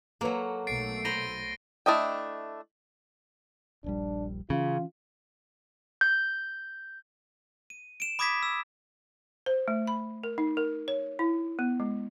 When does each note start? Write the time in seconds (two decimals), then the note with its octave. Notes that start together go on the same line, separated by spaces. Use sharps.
0.21 F#3 A#3 A4 B4 C#5
0.67 B1 A3 A6 C7 D7
1.05 C5 A#5 B5 A#6 D#7 G7
1.86 A3 D4 E4 D#5 G5
3.84 D#1 A#1 G3 D4
4.50 C#3 E3 C#4 F4
6.01 G6
7.70 D#7
8.00 D7 E7
8.19 B5 D6 D#6 G#6 A#6 B6
8.43 E6
9.46 C5
9.68 A3
9.87 B5
10.24 A#4
10.38 D#4
10.57 A#4
10.88 C#5
11.19 E4
11.59 B3
11.80 G#3